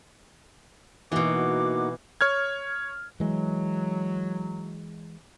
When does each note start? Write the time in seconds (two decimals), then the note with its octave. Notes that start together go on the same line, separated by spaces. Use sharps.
1.12 B2 E3 A#3 D#4 F#4 D6
2.21 C#5 F6 G#6
3.20 E3 F#3 G#3